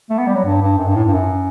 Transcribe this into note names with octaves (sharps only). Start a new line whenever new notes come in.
A3
B3
G3
F#3
G2
G2
F#2
G2
A2
G2
F#2